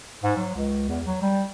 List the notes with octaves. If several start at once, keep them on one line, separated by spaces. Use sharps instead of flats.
G#2
F#3
C#2
E2
F#3
G3